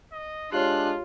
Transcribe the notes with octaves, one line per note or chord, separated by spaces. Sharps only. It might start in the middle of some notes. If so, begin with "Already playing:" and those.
D#5
G#3 D4 F4 G4 C#5 F#6